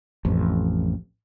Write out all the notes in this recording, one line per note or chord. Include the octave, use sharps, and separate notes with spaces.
A1 F2